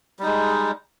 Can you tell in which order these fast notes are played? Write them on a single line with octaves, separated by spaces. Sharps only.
G3 D#4 G#3